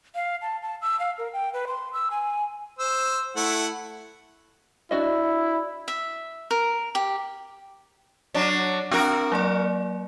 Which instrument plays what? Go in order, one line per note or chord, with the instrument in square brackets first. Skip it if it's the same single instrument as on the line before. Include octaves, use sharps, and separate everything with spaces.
[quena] F5
A5
A5
E6
F5
A#4
G5
B4
C6
E6
G#5
[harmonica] C5 E6
A3 E4 F#5
[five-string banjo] D4 F#4 D#5 [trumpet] E4
[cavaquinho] E5
A#4
G4
[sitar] F#3 D4 [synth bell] C#5 F#5
[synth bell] C4 D4 [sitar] F#4 A#4
[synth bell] F#3 A#3 D5